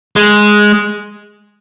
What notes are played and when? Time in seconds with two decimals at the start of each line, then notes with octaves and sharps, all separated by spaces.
0.16 G#3